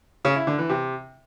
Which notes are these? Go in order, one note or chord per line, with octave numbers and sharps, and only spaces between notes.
C#3
E4
D3
E3
C3